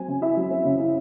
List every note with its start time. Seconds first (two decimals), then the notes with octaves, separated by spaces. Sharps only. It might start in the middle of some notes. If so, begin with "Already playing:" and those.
Already playing: F#3 C4 G#5
0.08 C#3
0.21 E4 E5
0.37 F#3
0.51 C4
0.65 C#3
0.80 E4